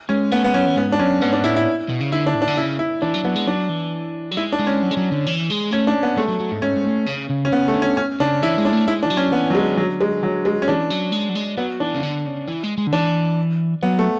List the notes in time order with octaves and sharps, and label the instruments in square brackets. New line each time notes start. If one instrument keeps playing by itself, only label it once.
[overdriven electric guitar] G#3 [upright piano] C#4
[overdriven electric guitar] A3 [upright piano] B3
[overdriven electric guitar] G#3 [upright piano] B3
[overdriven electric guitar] F#3 [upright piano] C#4
[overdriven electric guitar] E3
[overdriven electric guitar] G#2 [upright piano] B3
[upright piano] D4
[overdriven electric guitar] F#2 [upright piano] C#4
[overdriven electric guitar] G#2 [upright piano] B3
[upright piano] D4
[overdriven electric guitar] A2 [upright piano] E4
[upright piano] E4
[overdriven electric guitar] B2
C#3
[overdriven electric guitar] D3 [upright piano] E4
[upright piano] D4
[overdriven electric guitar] A2
[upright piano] D4
[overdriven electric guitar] D3
[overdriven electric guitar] C#3 [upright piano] E4
[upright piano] E4
[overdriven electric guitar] E3 [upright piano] D4
[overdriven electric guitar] F#3
[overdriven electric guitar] F#3 [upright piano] B3
[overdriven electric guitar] G#3
[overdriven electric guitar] F#3 [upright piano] D4
[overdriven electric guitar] E3
F#3
[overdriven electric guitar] G#3 [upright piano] E4
[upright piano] D4
[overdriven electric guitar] G#3
[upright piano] C#4
[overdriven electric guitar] F#3
G#3
F#3
D3
E3
G#3
[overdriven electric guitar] A3 [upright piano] C#4
[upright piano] D4
B3
[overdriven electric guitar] G#3 [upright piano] A3
[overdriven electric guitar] F#3
F#3
G#2
[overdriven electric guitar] G#2 [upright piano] C#4
[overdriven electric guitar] G#2
A2
C#3
C#3
[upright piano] C#4
[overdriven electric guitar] C#3 [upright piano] B3
[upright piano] A3
[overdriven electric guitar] D3
[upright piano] C#4
C#4
[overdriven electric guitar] C#3 [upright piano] D4
[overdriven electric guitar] E3 [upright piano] E4
[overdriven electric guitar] G#3
[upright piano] D4
[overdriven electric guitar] A3
[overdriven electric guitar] G#3 [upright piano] E4
[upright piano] D4
[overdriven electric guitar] E3
F#3
[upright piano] C#4
[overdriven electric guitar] E3 [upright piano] B3
[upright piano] F#3
[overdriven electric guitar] D3 [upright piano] G#3
[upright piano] F#3
G#3
F#3
G#3
C#4
[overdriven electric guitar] E3 [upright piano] D4
[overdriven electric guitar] F#3
G#3
F#3
G#3
[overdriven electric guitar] F#3 [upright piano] B3
[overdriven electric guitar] E3 [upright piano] D4
[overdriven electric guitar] C#3
D3
C#3
E3
G#3
G#3
D3
[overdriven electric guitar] E3 [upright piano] D4
[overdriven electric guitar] F#3 [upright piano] B3
[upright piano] A3